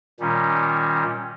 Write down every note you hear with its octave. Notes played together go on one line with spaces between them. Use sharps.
A#2 D#3 G3 C#4